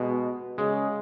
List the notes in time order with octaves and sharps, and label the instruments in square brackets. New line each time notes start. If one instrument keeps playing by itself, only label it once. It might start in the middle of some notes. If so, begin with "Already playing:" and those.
Already playing: [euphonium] B2 [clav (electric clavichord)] G#3
[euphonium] C#3 [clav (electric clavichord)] G#3